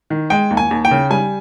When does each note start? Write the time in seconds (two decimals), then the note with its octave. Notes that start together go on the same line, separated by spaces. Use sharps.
0.10 D#3
0.30 G#3 G5
0.51 D#2
0.57 G#5
0.71 D#2
0.85 G5
0.91 C#3
1.10 G3 G#5